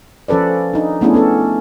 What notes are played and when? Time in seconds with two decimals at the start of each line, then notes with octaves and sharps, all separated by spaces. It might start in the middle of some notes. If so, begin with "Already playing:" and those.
0.28 F3 C#4 A4 B4 D5
0.74 D4 D#4
1.01 A3 B3 C#4 D4 E4 G#4
1.14 B3 C#4 A4